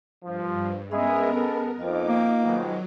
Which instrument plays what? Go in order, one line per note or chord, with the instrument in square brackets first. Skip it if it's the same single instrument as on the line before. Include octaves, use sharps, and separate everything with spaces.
[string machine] G2 [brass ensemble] F3
[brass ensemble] G#3 G#4 E5 [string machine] B3 A#4 [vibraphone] C#4 D#5 B5
[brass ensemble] G#4 A4
[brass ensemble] F2 [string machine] D#4 D6 [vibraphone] F4 D#5
[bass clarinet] A#3
[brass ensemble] G#2 B2 D#3 [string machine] F#3